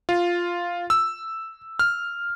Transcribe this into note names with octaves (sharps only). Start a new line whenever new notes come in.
F4
E6
F6